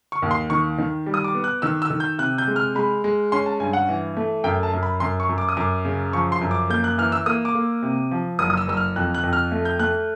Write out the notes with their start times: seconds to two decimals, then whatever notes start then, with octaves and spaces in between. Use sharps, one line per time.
0.12 C#6
0.22 D#2
0.31 C6
0.50 D#3 C#6
0.78 D#3
1.06 G3
1.14 D#6
1.24 D6
1.35 B3
1.44 F#6
1.62 D#3 E6
1.82 E6
1.90 D#3
2.00 G6
2.18 C3 F#6
2.38 G6
2.47 G#3
2.56 F6
2.75 G#3 B5
3.04 G#3
3.32 C#4 C6
3.46 A5
3.60 G2 G#5
3.73 F#5
3.89 E3
4.17 A3
4.44 F#2 G5
4.63 A5
4.73 F#2
4.83 B5
5.00 F#2 C6
5.20 C#6
5.29 F#2
5.38 D6
5.49 D#6
5.57 F#2 D6
5.85 C#3
6.13 F3 C#6
6.32 C6
6.41 F#2
6.51 D6
6.69 A#3 G6
6.84 F#6
6.98 E3 F6
7.12 E6
7.26 A#3 D#6
7.45 D6
7.55 A#3
7.83 C3
8.11 F3
8.39 F#1 D#6
8.50 D#6
8.57 E6
8.68 F#1 E6
8.77 F6
8.96 F2 F#6
9.15 F#6
9.23 F2
9.33 F6
9.52 A3
9.65 G6
9.79 A3 F#6